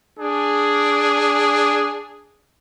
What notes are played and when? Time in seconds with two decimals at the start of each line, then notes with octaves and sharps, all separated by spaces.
0.20 D4 G#4